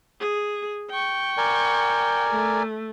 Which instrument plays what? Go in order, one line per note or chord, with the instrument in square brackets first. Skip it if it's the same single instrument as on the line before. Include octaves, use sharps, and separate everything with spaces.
[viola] G#4
G5 C#6
[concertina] A#4 D5 G#5
[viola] A3